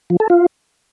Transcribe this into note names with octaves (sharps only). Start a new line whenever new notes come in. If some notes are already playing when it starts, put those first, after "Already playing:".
F3
A4
F4